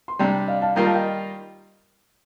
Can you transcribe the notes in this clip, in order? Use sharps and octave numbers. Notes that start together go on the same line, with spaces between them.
C6
C3 G3 D4 G5 A#5
D5 F5
F5 A5
D#3 G3 A#3 F4 A#4 G5 A#5
F5 A5
D#5 G5